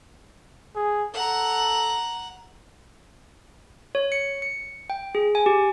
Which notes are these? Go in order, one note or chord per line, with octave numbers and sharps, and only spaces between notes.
G#4
A4 F#5 A#5
C#5
C#7
C#7
G5
G#4
G#5
G4